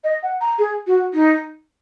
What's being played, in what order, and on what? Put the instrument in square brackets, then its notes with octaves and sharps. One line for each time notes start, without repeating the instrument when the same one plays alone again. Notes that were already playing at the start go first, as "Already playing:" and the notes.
[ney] D#5
F#5
A#5
G#4
F#4
D#4